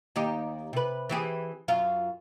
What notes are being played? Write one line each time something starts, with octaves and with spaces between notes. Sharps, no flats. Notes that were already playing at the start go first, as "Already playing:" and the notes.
D#2 D#4 G4
C3 B4
E3 G4 G#4
F#2 F4